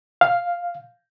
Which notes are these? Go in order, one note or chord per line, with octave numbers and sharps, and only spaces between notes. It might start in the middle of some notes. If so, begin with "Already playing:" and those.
F5